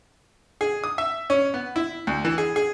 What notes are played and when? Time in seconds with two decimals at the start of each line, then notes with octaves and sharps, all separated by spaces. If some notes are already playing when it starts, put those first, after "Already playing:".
0.61 G#4
0.84 D#6
0.98 E5
1.30 C#4
1.54 B3
1.76 E4
2.07 D2
2.25 E3
2.38 G#4
2.56 G#4